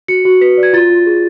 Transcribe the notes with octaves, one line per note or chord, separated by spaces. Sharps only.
F#4 C#7
F#4
B4 B6
D5
G#6
F4 A6
F4
G#4